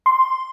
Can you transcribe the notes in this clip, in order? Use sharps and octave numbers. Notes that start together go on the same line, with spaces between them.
C6